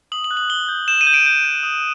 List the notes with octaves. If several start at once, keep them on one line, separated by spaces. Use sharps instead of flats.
D#6 F#7
F#7
F#6
F#7
D#6 G7
G6
G6 E7
D#7
G6
D7
G6 D#7
G6
D#6